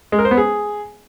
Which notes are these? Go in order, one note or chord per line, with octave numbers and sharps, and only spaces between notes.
G#3
A#4
C5
B3
G#4